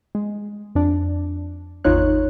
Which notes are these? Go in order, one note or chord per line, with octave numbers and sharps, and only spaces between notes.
G#3
F2 D4
G#1 E2 D#4 F4 C#5 F#6